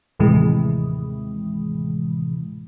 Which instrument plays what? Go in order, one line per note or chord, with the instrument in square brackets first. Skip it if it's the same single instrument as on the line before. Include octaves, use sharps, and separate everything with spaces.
[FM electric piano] D#2 A2 C3 E3 G#3